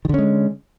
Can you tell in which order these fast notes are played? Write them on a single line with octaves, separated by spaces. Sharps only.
D#3 D3 C#4 G#3